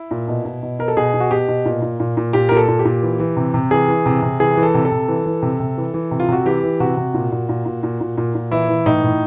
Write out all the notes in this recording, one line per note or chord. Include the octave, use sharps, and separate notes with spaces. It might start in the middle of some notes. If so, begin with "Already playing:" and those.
Already playing: E4
A#2
B2
B2
B2
B2 A#4
A4
B2 G#4
B2
F#4
B2 G4
B2
A#2
A#2
A#2
A#2
A#2 G4
A#2 A#4
A4
A#2
G4
A#2
E3
E3
C3
C3
E3 G#4
E3
C3
C3
E3 G#4
E3
A4
C3
A4
C3
E3
E3
C3
C3
E3
E3
C3
F4
C3 F#4
E3 G4
E3
C3 F#4
C3
A#2
A#2
A#2
A#2
A#2
A#2
A#2
A#2
E3 E4
E3
A2 D#4
A2